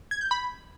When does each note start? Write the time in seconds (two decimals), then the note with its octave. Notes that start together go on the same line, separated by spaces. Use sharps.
0.11 G#6
0.21 G6
0.31 B5